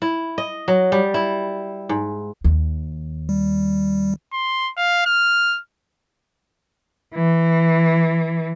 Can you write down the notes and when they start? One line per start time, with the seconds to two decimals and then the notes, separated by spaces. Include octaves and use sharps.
0.02 E4
0.38 D#5
0.68 F#3
0.92 G3
1.14 E4
1.89 G#2
2.44 D#2
3.29 G3
4.33 C6
4.77 F5
5.06 F6
7.15 E3